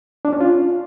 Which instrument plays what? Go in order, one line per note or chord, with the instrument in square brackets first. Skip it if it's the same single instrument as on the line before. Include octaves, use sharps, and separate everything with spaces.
[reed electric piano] D4
C#4
F4